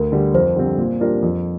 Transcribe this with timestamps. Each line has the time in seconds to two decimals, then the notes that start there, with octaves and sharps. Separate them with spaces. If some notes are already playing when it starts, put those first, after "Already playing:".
Already playing: D2 A#4
0.12 D3 G3
0.34 F2 C5
0.56 D3 G3 C4
0.78 A#2
1.00 G3 D4 F4 A#4
1.22 F2